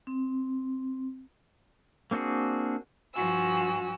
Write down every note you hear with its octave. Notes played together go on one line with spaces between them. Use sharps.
C4
A#3 C4 D4 F#4 G#4
G2 F3 F#4 G#5 E6